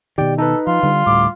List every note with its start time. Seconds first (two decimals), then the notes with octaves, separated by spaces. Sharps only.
0.18 B2 D#3 G4 D5 G5
0.38 D#4 A4 B4
0.67 F3 F4
0.83 D3 G3
1.06 D2 A2 G3 D6